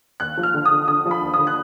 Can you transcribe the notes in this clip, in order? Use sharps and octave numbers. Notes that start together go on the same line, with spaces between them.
D#2 F#6
F3
F6
D3
D#6
D3
D3 D#6
F3
B5
D#2
D#6
D3
F#6